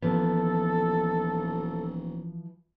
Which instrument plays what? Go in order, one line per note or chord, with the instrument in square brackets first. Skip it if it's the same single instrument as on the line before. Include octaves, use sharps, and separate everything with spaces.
[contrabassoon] D#1 [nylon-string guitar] E3 F3 [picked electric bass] B3 [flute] A4